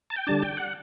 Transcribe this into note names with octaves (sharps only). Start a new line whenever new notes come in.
A5
G5
D3 G3 D4 A5
G5
F#5